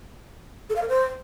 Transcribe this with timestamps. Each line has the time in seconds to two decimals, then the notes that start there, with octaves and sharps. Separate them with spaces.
0.70 A4
0.76 F5
0.82 A#4
0.88 C5